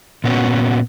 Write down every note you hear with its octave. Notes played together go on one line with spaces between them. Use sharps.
A#2 B3 C#4 F#4